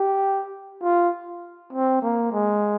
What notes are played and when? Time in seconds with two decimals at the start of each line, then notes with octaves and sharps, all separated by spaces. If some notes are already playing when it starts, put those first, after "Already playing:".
Already playing: G4
0.82 F4
1.73 C4
2.02 A#3
2.32 G#3